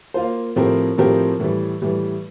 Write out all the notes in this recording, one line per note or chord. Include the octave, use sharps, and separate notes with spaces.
A#3 F4 C5
A2 F3 C4 G4 A#4
A2 F3 C4 G4 A#4
A2 E3 G3
A2 E3 G3